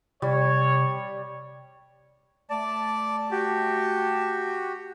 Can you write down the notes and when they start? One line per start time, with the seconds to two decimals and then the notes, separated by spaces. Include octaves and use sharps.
0.22 C3 G3 C#5
2.50 A3 D5 A5
3.31 F#4 G4